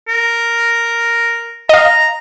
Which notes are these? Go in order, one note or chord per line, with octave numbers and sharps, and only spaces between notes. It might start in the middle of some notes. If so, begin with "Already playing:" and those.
A#4
D#5 F5 A#5